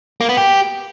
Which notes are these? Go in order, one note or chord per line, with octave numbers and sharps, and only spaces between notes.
A#3
B3
G4